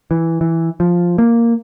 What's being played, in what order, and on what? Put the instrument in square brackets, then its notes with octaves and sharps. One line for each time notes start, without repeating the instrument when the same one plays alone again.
[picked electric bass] E3
E3
F3
A#3